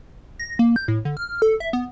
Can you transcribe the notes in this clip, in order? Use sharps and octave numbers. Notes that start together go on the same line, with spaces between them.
A#6
A#3
G6
A2
D3
F6
A4
E5
B3